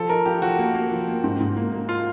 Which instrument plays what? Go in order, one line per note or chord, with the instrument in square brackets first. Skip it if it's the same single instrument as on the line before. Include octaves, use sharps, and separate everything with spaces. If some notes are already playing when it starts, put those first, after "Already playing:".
Already playing: [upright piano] F3 [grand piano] A4
[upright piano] D#4 [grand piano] A#4
[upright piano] F3 [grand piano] G4
[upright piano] F3 [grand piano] F#4
[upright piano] A#3
A#3
F3
A#3
G#2
G#2
A#3
A#3
[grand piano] F4